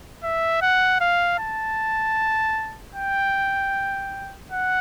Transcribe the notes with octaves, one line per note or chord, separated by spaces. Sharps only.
E5
F#5
F5
A5
G5
F#5